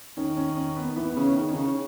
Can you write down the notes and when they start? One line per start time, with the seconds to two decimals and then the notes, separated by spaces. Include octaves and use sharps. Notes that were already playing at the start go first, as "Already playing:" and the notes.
0.17 D#3 C#4
0.37 C#4
0.57 C#4
0.76 B3
0.96 E3 B3
1.16 C#3
1.23 C#4
1.36 D#3
1.49 C#4
1.55 C#3